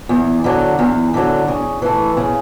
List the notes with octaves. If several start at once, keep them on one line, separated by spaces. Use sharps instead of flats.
E2
D3 F#3
E2
D3 F#3
C#3
E3 A3
C#3